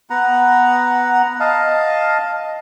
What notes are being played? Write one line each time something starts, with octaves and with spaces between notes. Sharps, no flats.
B3 F#5 A#5
D#5 F5 A5